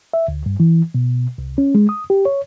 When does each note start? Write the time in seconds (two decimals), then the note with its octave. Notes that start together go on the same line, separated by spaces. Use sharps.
0.14 E5
0.28 D2
0.46 G2
0.60 E3
0.94 B2
1.38 C2
1.58 C#4
1.75 G#3
1.89 D#6
2.10 G4
2.25 C#5